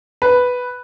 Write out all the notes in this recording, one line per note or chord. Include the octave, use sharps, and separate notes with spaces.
B4